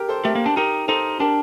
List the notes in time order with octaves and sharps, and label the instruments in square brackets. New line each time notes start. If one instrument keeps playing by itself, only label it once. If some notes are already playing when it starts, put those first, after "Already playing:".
Already playing: [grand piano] G4 A#4
A4 C5
[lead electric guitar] A3 [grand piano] G4 A#4
[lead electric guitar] A#3
D4
[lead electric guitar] D#4 [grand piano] G4 A#4
[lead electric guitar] D#4 [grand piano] A4 C5
[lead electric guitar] D4 [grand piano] G4 A#4